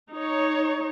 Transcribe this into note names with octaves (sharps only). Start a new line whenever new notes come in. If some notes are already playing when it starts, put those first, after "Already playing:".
D#4 C#5